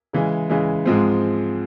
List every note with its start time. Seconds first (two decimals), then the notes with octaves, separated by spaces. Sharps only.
0.13 C#3 E3 G#3
0.50 C#3 E3 G#3
0.86 G#2 F3 G#3 C4